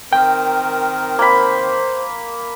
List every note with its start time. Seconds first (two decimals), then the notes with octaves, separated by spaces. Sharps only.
0.13 D#3 C4 A#4 G5
1.19 A#3 C5 B5